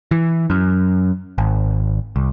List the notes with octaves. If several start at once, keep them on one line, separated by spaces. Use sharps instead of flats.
E3
F#2
G#1
C2